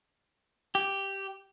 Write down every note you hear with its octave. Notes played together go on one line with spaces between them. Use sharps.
G4